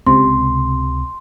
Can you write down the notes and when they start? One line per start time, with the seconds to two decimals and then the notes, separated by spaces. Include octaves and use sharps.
0.07 C#2 C3 C6